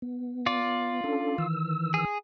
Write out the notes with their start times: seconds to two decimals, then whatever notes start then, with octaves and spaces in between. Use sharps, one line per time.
0.02 B3
0.46 F4 D5
1.04 C#4 D4 A4
1.38 D#3 E3 E6
1.94 G#4